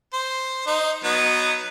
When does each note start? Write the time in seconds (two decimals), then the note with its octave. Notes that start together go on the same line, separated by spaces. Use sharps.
0.13 C5
0.67 D#4 C5
1.04 F#3 B3 D#4